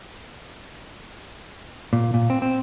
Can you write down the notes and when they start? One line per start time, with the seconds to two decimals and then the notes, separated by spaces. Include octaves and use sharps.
1.93 A#2
2.14 A#2
2.30 C4
2.42 C4